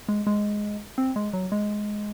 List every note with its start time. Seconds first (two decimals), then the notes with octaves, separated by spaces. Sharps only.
0.09 G#3
0.27 G#3
0.98 C4
1.16 G#3
1.33 F#3
1.52 G#3